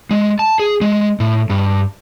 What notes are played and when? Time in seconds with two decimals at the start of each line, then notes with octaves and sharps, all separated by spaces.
0.11 G#3
0.39 A5
0.59 G#4
0.81 G#3
1.20 A2
1.50 G2